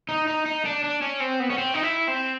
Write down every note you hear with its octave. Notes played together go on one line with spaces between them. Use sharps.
D#4
D#4
D#4
D4
D4
C#4
C4
B3
C#4
C4
D#4
E4
C4